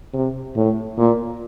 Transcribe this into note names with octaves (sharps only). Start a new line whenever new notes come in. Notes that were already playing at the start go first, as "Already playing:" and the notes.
C3
A2
A#2